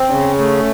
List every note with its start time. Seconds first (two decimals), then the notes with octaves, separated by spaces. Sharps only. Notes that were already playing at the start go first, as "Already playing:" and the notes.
Already playing: C4
0.10 C#3 C#4
0.38 A3